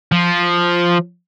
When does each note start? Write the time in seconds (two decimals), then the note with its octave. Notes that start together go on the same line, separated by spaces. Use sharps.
0.12 F3